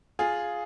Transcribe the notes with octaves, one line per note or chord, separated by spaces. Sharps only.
F4 G#4